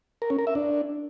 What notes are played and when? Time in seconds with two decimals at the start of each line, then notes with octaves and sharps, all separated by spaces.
0.22 A#4
0.30 C#4
0.39 A#4
0.47 E5
0.55 D4